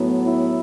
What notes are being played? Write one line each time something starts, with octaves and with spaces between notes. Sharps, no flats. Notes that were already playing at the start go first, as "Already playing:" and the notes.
Already playing: A2 F#3 B3
E4